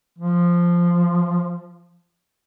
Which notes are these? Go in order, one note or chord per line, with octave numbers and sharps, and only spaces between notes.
F3